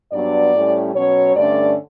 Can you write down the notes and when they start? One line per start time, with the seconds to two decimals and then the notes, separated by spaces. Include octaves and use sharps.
0.12 G2 F#3 B3 D4 D5
0.53 A2 G3 C#4
0.94 B2 F#3 C#4 C#5
1.35 G2 D3 A3 C#4 D5